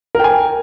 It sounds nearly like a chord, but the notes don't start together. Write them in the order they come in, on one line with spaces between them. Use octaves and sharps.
A#4 G5 G#5